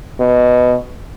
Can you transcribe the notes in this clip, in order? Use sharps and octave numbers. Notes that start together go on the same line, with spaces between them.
B2